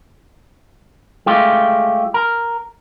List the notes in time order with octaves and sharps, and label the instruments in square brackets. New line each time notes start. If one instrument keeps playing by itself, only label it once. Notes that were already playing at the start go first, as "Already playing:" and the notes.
[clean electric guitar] G#3 A3 F4 G4
A#4